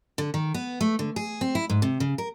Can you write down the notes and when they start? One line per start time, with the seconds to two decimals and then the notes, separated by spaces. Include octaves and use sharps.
0.18 D3
0.34 D#3
0.54 B3
0.81 A3
0.99 D3
1.16 G#4
1.41 C4
1.55 E4
1.70 G#2
1.82 C3
2.00 C#3
2.18 A#4